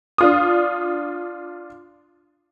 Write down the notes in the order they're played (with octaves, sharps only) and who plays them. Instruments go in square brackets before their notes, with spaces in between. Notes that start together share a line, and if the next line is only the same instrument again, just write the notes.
[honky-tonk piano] D4 F4 D#6